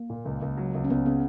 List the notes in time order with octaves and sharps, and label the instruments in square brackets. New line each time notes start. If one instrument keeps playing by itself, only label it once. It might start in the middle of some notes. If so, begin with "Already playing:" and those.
Already playing: [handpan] A#3
[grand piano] A#2
C#2
C#2
F#3
C#2
[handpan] C#4
[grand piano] C#2 [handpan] B3
[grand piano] C#3 [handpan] B3